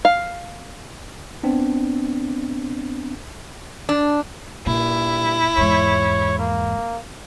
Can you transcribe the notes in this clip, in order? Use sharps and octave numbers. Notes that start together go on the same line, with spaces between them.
F5
B3 C4 D4
D4
G2 A#2 E4
E2 G#2 C#5
A#3